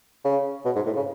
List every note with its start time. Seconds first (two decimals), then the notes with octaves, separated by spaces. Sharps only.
0.25 C#3
0.65 B2
0.76 G#2
0.86 A2
0.96 C#3